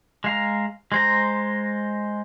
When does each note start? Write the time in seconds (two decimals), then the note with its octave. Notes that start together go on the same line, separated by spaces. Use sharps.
0.24 G#3 F5 A#5
0.92 G#3 C5 A#5